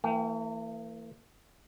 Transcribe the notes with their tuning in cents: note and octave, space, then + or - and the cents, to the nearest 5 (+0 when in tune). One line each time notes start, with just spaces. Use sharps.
E3 +10 A#3 -45 G5 -15